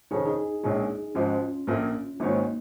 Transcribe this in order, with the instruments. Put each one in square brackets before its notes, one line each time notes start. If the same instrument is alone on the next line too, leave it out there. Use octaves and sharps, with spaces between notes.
[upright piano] F1 F2 D#3 C#4 [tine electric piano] G#4
[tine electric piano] D#4 G#4
[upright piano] A#1 A#2 G#3 C#4
[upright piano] G#1 G#2 F3 [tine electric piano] C#4 F4
[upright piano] A#1 A#2 A#3
[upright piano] G#1 G#2 D#3 C#4 [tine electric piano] A#3 D#4